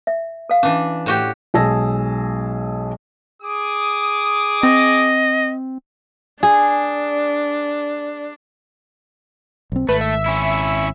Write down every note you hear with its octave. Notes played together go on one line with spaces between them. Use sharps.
E5
A4 F5
E3 C#4 D4
A2 F#4 G4
B1 G#3 G#4 A5 E6 A#6
G#4 D6 D#6
C4 D#5
D4 G#4
B1 C4
G#1 A3 B4
E5
C#4 E4